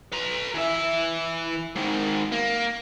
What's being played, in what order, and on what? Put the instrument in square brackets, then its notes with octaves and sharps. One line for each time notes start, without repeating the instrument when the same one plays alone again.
[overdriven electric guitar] B4 A#5
E3 E5
G#2 D#3
A#3